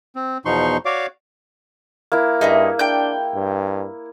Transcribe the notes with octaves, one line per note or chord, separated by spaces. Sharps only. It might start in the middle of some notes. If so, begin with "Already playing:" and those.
C4
E2 B2 F3 D#4 C6 C#6
F#4 C#5 D5 F5 D6
A#3 E4
G2 D#4 G#4 D#5 E5
D4 G5 G6
G2